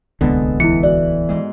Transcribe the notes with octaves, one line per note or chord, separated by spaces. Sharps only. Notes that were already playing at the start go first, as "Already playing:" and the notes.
D1 C2 D3 G#3 B3 A4
E3 E4 C#7
F#4 D5
G#2 G#3